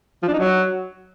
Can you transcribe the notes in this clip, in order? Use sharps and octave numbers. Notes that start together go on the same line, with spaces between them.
F3
D4
D#4
F#3